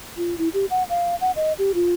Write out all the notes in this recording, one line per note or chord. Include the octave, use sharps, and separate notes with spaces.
F4
E4
G4
F#5
F5
F#5
D#5
G4
F4